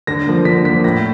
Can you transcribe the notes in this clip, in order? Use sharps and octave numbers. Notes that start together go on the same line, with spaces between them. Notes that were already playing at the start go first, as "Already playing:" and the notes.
D3 A#6
F3 A#3
D3 B6
F3 A#3 B6
A2 A#6